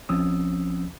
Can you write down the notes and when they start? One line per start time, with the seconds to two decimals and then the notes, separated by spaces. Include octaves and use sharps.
0.09 A#1 F3 C4 C#4 D#6 E6